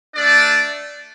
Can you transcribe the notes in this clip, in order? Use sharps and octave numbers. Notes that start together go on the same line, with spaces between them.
A3 D4 A4 D5